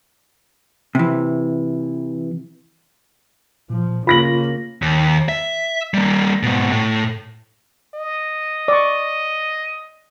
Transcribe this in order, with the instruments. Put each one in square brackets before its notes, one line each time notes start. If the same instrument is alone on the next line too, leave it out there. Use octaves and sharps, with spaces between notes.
[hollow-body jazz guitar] C3 E3
[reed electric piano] A#2 [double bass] F3
[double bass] C#3 A#3 [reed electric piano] F4 [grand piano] B5 A#6 F#7
[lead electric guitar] D#2
E5
G3 A#3
G#2 B2
A2
[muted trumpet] D#5
[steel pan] D5 C#6